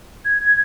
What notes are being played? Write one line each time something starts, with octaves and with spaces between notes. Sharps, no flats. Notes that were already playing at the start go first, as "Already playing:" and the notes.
G#6